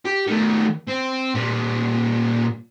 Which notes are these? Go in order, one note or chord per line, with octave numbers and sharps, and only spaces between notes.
G4
D#3 A3
C4
A#2 G3